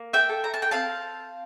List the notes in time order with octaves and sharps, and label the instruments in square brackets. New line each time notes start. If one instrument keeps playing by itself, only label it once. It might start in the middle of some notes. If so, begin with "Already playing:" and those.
Already playing: [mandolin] A#3
E5 G5
A4
A#5
A5
G5
C4 F5 A5